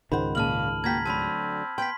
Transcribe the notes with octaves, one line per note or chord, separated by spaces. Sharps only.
C#2 G#2 D#3 C5 F#5 B5
A#2 C#3 F5 A5 F6 F#7
A#3 F#4 G5 A#5 G#6 B6
D2 D3 F#3 C4 A5 B5
B3 G5 C6 B6